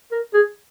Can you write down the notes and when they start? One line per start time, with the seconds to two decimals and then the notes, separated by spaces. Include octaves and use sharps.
0.12 A#4
0.34 G#4